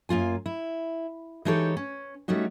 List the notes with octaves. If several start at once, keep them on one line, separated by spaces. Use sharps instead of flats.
F#2 A#3 F4 G#5
E4
E3 G#3 D#4 G4 A4 C#5
C#4
G3 A3 C#4 D#4 F#4